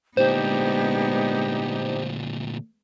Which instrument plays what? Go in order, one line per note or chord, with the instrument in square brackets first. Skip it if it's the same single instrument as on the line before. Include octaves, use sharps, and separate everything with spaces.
[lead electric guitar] D2 A#2 [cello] G#3 B3 [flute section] D4 D#4 G4 [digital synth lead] C5